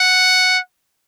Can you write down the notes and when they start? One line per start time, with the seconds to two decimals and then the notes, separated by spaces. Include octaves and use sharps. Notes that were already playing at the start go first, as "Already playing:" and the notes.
Already playing: F#5